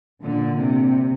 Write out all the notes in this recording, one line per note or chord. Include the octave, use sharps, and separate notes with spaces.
A#2 D3
C3